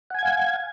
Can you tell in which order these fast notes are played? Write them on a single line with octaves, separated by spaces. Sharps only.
F#5 G#5 G#6 F5